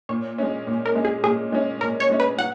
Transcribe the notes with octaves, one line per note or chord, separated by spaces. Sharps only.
A#2 C#5
G#3 C#4
A#2
A#4
G#3 C#4
G#4
A#2 G#4
G#3 C#4
A#2 A#4
C#5
G#3 C#4
B4
F#3 F#5